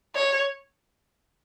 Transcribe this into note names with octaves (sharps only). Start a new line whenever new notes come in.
C#5